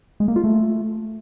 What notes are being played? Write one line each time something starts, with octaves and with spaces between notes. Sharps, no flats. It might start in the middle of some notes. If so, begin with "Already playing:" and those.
G#3
A#3
F4
A3